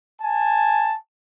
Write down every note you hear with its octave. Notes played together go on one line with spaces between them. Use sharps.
G#5 A5